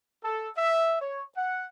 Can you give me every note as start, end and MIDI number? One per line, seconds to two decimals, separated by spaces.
0.23 0.49 69
0.56 0.96 76
1.01 1.23 73
1.36 1.65 78